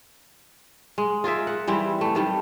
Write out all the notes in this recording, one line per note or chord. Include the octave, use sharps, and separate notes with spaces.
G#3
F4 G#4 A#4 E5
F#5
E3 G3 C4 E4
A3
D#3 G3 A3